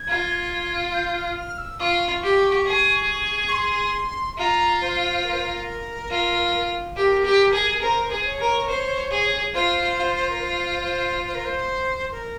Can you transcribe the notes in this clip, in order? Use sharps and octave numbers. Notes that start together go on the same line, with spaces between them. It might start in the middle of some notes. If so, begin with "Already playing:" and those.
Already playing: G#6
F4
G6
F6
F6
E6
F4 C#6
G4
G#4
C#6
C6
F4 A#5
C5
A#4
C5
A#4
F4
G4 A#4
G4
G#4
A#4 C5
G#4
C#5
A#4
C5
G#4
F4 C5
F4
A#4
C5
C5
C5
A#4
C5
A#4